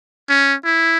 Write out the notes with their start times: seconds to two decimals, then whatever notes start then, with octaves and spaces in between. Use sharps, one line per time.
0.29 C#4
0.65 E4